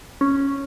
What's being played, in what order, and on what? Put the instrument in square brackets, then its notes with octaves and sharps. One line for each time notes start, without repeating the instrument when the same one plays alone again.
[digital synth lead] C#4